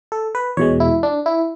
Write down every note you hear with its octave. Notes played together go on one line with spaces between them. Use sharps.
A4
B4
E2 B2 G#3 C#5
E4
D4
E4